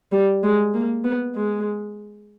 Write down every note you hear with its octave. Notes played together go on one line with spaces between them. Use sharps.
G3
G#3
A#3
B3
G#3